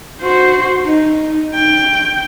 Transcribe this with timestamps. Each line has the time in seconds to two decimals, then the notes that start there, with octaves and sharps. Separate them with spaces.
0.22 F#4 C5
0.85 D#4
1.54 G5